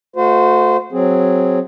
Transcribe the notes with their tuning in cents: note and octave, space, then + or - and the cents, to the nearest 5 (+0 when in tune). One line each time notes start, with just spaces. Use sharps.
A3 +0 F#4 -30 C5 -25
F#3 +0 C4 +0 G#4 +0